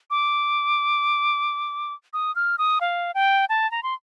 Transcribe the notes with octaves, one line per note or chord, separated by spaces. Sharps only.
D6
D#6
F6
D#6
F5
G5
A5
A#5
C6